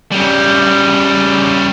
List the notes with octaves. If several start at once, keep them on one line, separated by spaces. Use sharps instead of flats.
C#3 G3